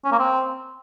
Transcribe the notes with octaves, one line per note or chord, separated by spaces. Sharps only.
C#4
A#3
C4